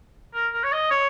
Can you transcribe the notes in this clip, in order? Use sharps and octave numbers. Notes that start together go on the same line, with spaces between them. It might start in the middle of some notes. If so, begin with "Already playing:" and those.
A#4
A#4
C#5
D#5
C#5